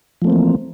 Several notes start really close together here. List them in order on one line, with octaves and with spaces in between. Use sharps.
F3 A3 C4 A#3 E3